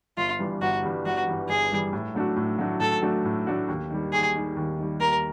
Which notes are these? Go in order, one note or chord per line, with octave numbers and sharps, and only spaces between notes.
G1 F4
G2 E3 G3
G1 F#4
G2 E3 G3
G1 F#4
G2 E3 G3
G1 G#4
G2 E3 G3
A2
F#3 A3 D4 F#4
A2
F#3 A3 D4 F#4
A2 A4
F#3 A3 D4 F#4
A2
F#3 A3 D4 F#4
D#2
D#3 G3
D#2 G#4
D#3 G3
D#2
D#3 G3
D#2 A#4